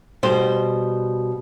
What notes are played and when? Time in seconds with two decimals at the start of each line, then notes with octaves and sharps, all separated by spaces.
0.23 B2 G3 C5